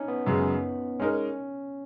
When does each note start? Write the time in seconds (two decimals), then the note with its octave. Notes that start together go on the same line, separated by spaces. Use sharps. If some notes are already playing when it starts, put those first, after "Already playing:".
Already playing: C#4 D#4
0.08 B3
0.26 F#2 C#3 G#3
0.99 G#3 C#4 D#4 A#4